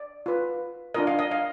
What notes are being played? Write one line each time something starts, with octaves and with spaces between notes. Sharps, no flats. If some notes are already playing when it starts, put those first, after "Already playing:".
Already playing: D5
F4 B4
D4 F4 A#4 D#5
F5
D#5
F5